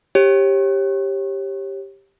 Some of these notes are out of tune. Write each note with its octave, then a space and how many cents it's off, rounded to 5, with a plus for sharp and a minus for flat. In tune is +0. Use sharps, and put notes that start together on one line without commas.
G4 +0 C#5 -30